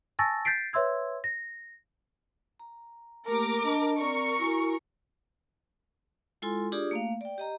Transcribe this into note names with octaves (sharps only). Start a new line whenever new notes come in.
G#5 A5 C#6 E6 A6 A#6
G6 A6 B6 C7 D7
B4 C#5 E5 C6 E6 G#6
A#6
A#5
A3 A#3 G4 A#4 D6
D4 D#5 A5
C4 A#4 D5 C#6
E4 F#4 G#5
G#3 E4 F4 A4 G#5 C6
D4 F4 G4 G#4 D5 D#6
A3 A#3 F5
D5 G5
G4 D#5 A#5